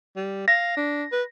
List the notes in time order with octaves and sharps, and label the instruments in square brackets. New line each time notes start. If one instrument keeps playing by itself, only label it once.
[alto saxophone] G3
[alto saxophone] F5 [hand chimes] A#6
[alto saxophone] D4
B4